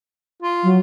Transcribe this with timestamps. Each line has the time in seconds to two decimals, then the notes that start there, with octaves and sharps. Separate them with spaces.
0.42 F4
0.63 F#3